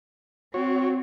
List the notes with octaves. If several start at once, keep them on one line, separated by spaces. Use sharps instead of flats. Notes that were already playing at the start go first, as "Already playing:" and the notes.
C4 F#4 C#5